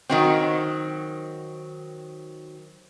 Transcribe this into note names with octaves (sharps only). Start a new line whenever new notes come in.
D#3 F#3 C4